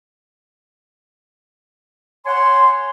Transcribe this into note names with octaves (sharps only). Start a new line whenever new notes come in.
C#5 F#5 G#5 C6